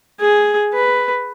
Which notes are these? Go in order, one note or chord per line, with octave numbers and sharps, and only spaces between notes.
G#4
B4